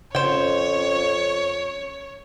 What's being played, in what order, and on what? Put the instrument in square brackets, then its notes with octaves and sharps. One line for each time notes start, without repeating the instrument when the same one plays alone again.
[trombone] F2 [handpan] C#3 [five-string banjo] C5 G5 [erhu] C#5